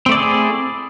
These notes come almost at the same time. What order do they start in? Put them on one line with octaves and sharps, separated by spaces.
C4 A3 D5 E4 G#4